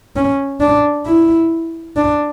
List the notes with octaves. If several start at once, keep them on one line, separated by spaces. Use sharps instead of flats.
C#4
D4
E4
D4